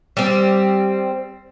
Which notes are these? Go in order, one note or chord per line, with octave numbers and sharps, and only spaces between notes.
G3 C4